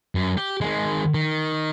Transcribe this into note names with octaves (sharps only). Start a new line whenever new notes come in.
F#2
G4
D#3 G#3
D#3